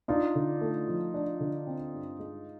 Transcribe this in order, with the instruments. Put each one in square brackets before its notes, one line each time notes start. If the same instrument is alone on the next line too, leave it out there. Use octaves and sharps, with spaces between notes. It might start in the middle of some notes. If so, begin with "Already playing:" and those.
[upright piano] D4 [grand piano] D#4 F4
[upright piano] D3
A3
F3
D4
D3
C4
G2
G#3